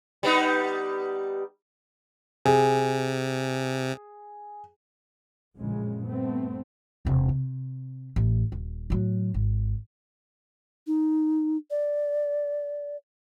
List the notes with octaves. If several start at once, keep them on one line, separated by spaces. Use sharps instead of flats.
G3 B3 D#4
C3 G#4
A#1 F#2 A2 C#3 G#3
G2 A3 B3 C4
E1 C3
C3
A1
D#1
A2 F#3
G#1
D#4
D5